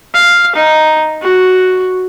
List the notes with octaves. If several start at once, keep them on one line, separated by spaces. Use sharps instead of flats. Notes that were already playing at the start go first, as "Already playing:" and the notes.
F5
D#4
F#4